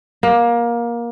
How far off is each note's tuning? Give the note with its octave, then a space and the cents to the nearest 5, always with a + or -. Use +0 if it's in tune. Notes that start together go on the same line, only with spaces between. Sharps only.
A#3 +20